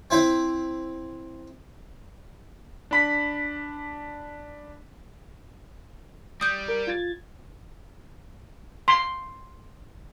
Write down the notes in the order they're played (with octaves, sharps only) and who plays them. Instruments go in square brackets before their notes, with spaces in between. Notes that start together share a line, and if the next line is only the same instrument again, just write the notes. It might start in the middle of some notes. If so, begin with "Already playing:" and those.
[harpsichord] C4 E4 C5
[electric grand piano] D4 B5 B6
[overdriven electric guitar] G3 [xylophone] D#6 G6
[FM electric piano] A#4
F4 G#6 A6
[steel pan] C6